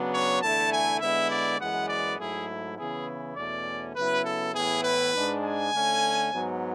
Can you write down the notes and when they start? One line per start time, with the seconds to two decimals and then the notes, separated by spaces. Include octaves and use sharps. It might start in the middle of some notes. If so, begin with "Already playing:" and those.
Already playing: C#3 F#3 B3 D4
0.12 C#5
0.41 E2 D3 A3 E4 A5
0.71 G#5
1.00 D3 G#3 B3 E4 E5
1.30 D5
1.59 F#2 E3 G#3 B3 F#5
1.89 D5
2.18 G#2 F#3 A3 E4 G#4
2.78 C#3 E3 B3 E4 G#4
3.36 E2 B2 A3 C#4 D5
3.95 C#3 F#3 B3 E4 B4
4.24 A4
4.54 A2 E3 B3 E4 G#4
4.83 B4
5.14 G#2 G#3 D4
5.42 G#5
5.72 D3 A3 C#4
6.31 G#2 F#3 B3